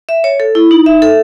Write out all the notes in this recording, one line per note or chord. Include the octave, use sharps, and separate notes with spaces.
E5
C#5
A4
E4
D#4
E5
A4